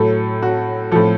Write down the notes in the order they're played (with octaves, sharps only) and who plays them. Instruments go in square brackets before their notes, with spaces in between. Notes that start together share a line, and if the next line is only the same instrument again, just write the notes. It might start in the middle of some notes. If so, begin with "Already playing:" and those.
Already playing: [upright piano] A2 F#3 A4
F#4
A2 F3 A4